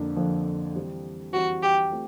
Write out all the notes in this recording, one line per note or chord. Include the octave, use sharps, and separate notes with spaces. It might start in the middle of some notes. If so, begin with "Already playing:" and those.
Already playing: F2 D3 F3 A#3 D4
F2 D3 F3 A#3 D4
E3 G3 C4
E3 G3 C4 F#4
G4
A3 C4 F4